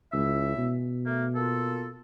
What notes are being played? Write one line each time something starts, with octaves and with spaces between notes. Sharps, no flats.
C#2 C#4 E4 E5
B2
A3 A#3
A#3 F4 A4